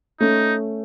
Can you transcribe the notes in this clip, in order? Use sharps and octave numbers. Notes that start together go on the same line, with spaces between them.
A3 C#4 D#4